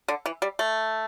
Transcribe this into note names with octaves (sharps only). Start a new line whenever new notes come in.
D3
E3
G3
A3